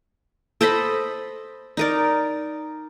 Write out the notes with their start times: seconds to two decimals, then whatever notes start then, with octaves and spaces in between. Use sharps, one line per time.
0.61 A4 C5 D#5 B5
1.77 D#4 A#4 D5